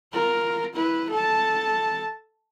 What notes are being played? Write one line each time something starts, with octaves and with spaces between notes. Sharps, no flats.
F4 A#4
E4 B4
A4 A5